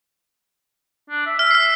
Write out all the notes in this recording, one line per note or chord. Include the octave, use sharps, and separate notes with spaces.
D4
E5
E5 F6
F6 C7